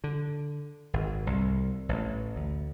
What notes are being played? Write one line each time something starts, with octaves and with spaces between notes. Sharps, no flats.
D3
G#1
C2
A1
D2